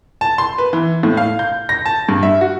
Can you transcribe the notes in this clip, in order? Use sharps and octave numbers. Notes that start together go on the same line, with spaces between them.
A5
C6
B4
E3
A2
F5
G6
A#6
A5
G2
E5
F#4